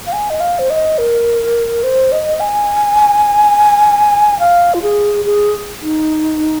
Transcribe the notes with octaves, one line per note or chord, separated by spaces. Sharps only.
F5
G#5
D#5
F5
C5
D#5
A#4
C5
D#5
G#5
F5
F4
G#4
G#4
D#4